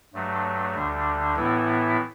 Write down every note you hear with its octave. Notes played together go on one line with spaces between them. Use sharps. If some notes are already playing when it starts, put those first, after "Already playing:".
G2 F#3 A3
D2 D3 G3 D4
A2 E3 B3 E4